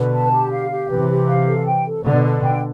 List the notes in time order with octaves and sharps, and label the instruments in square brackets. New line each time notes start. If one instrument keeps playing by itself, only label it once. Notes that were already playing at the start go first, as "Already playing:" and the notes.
Already playing: [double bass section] B2 D3 [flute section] B4
[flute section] A5
G4
F5
G4
[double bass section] C3 E3 [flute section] B4
[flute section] G4
F5
A4
G5
A4
[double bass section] B2 D3 [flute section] D5
[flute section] A4
G5